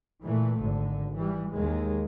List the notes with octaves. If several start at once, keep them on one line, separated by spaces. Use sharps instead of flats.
A#2 E3 A3
G#1 D3
E3 G3
D#2 D#3 G#3